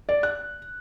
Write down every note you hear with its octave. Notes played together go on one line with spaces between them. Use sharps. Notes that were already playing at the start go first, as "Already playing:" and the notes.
D5
F#6